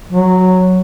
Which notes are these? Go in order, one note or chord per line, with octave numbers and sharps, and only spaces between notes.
F#3